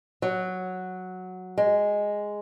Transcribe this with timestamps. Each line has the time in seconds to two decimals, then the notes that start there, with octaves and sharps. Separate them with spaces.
0.22 F#3
1.58 G#3